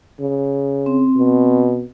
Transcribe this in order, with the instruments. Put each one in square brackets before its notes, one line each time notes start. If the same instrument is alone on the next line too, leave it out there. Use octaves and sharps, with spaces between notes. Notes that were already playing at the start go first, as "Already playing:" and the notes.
[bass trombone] C#3
[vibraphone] C4
[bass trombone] B2